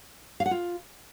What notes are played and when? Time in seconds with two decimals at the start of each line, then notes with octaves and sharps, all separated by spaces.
0.40 F5
0.46 F#5
0.51 F4